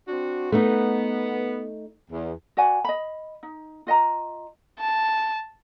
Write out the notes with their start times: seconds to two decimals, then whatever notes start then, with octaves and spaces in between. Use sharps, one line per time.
0.08 C4 D4 F#4
0.52 A3 B3 D#4
2.11 E2
2.57 F#4 D5 F#5 G#5
2.85 D#5 B5
3.43 D#4
3.87 F4 D#5 F#5 A#5
4.80 A5